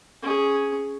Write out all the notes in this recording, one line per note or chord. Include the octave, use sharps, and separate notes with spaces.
C#4 G#4